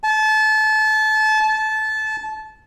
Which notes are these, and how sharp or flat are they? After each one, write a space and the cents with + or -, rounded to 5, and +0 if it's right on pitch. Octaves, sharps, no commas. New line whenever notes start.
A5 -25
A5 -20